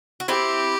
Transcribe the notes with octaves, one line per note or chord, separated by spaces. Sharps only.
F#4
C4 E4 G4